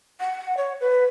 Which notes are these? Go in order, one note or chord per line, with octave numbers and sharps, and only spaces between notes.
F#5
C#5
B4